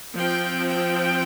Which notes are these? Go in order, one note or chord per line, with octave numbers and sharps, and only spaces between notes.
F3 C4 G5
G5